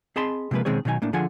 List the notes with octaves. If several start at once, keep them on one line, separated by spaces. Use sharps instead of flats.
C4 G#4 D#5 A5 B5 C6
C3 F3 G#3 A#3 B4
B2 D#3 G#3 C4 G#4 C#5
B2 D#3 F#3 D#4 G#5
A2 A#3 D4
D3 F3 F4 G#4 F#5 G#5